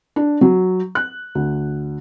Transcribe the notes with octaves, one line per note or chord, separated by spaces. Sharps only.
D4
F#3
F#6
D2